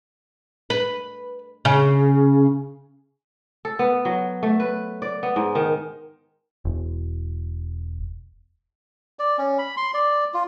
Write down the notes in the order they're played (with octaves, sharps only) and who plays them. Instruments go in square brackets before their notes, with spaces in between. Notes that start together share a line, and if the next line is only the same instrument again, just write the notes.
[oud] B4
C#3
[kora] A4
B3
F#3
A3
B4
D5
B3
G#2
D#3
[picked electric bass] E1
[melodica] D5
C#4
B5
C6
D5
F4